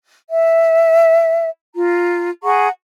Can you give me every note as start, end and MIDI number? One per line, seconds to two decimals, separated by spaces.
0.29 1.49 76
1.75 2.29 65
1.75 2.29 82
2.42 2.68 68
2.42 2.68 78
2.42 2.68 82
2.42 2.68 85